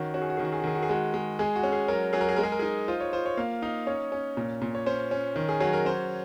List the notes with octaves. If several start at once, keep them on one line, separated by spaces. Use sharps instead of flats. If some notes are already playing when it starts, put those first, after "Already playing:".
Already playing: D#3 C#4 F#4
C#4 F#4
G#4
F#4
D#3 G#4
F#4
G#4
F#4
D#3 G#4
F#4
G#4
G#3 F#4
G#3
G#3 G#4
F#4
C#4
G#4
F#3 A#4
F#3 G#4
A#4
G#4
G#3 A#4
G#4
A#4
D#4 G#4
F4 C5
C#5
F4 C5
C#5
A#3 F5
D#4 F5
C#4 C#5
C#4
A#2
A#2
C#5
C#4 C5
C#4
D#3
G#4
F#3 G#4
A#4
C#4 C5